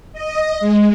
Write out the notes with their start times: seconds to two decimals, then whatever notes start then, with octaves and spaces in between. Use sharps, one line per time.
0.13 D#5
0.60 G#3